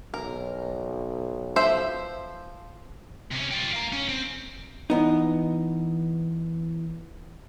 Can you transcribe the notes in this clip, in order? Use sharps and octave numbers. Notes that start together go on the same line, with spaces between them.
B1 A#4
F3 C5 E5
C3 C#4
F4 G4
F5 A#5
C#4
C4
E3 B3 D#4